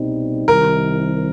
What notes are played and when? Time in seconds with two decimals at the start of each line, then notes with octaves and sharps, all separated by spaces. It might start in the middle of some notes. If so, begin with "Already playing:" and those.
Already playing: C2 B2 G3 C4 D#4
0.48 C2 C3 D#3 A#4